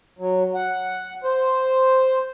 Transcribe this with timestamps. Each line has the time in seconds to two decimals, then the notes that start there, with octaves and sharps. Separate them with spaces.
0.19 F#3
0.55 F#5
1.24 C5